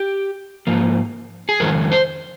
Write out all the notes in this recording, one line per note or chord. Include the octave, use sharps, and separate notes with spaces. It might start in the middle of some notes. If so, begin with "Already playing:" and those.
Already playing: G4
G#2 F3 A#3
G#4
F2 D#3 G#3 C#4 A#4
C5